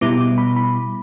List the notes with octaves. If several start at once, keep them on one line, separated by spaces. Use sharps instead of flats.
B2 G3 B3 E4 D6
D6
B5
B5